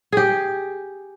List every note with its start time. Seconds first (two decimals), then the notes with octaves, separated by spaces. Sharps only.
0.12 G4 G#4